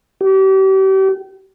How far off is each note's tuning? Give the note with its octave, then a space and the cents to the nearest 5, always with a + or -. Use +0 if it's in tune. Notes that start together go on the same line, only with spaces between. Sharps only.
G4 -35